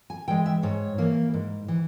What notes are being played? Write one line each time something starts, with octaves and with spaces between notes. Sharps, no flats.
G#5
E3 G#3 G5
E5
G#2 C#5
E3 A#3
G#2
E3